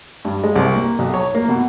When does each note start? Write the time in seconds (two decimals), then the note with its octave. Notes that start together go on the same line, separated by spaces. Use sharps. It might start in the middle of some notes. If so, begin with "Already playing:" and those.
0.25 G2
0.44 G#3
0.56 C2
0.75 A#3
0.99 B1
1.14 C#5
1.35 A#3
1.49 B2